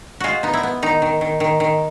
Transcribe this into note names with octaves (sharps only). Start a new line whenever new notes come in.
G#3 F4 F#4
B3 D#4
E4
B3
D#3 D#4
D#3
D#3
D#3
D#3